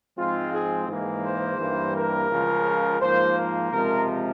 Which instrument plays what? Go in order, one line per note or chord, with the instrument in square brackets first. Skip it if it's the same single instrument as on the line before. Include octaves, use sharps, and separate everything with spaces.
[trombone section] G#2 F3 G#3 C4 F4
G#4
G#2 E3 A#3 G#4
C5
G2 E3 G3 A#3
A#4
C#2 C#3 F3
G#2 F3 A#3 C5
A#4
C#2 C3 F3 G#3 A#4